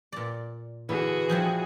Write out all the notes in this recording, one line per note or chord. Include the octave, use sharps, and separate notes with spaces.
A#2 D5
D3 E3 F#4 G#4
F3 G3 E4